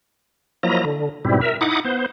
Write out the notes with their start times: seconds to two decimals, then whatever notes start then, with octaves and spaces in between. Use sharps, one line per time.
0.63 F3 F#3 A#3 E4 D#5 A#5
0.85 D3
1.25 G#2 B2 G3 C4 E4
1.41 A#4 E5
1.61 D#4 E4 F#5 D6 D#6
1.84 B3 C5